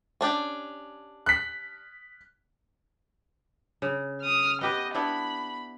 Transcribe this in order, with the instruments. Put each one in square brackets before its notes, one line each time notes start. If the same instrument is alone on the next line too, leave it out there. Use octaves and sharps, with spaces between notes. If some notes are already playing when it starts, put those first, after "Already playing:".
[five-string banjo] C#4 D4 G4
[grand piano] F#6 B6
[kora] C#3
[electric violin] D#6 F6
[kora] B3 G4 B4 [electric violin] D#5
[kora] B3 D4 E4 [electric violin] B5